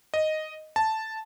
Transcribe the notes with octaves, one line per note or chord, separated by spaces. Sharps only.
D#5
A5